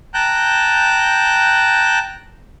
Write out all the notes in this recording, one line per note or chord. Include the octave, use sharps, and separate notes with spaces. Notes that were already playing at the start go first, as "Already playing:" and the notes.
G5 A5 A#5 F#6 G6